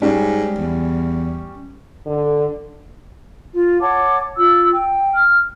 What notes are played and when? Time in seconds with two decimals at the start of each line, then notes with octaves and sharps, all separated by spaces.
0.02 G#2 G3 C#4
0.59 E2
2.06 D3
3.54 F4
3.81 C#5 F#5 A5 D6
4.36 F4 E6
4.72 G5
5.16 F6